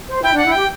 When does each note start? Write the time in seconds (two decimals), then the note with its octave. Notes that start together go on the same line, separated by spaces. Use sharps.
0.09 C5
0.23 E4 G5
0.34 D4 F#5
0.45 E4
0.52 G4 G5